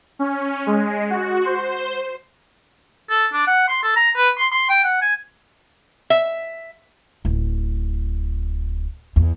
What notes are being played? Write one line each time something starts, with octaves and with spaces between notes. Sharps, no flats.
C#4
G#3
F#4
C5
A4
D4
F#5
C6
A4
A#5
B4
C6
C6
G5
F#5
G#5
E5
D1
E2